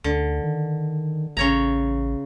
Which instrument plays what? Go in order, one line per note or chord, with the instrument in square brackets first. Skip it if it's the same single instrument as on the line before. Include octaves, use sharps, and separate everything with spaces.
[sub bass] D2 [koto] D3
[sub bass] D#3
[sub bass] A1 [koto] C#3 C#5 A#5